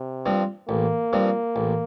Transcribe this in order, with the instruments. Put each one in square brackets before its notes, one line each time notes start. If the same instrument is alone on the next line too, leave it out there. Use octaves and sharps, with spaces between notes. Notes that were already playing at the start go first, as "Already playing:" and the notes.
Already playing: [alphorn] C3
[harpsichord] G2 F3 C4
[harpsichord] A1 [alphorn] A#3
[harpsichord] G2 F3 C4
A1